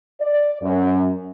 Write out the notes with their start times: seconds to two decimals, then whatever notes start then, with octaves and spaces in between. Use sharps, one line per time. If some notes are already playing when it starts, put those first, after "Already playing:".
0.20 D5
0.62 F#2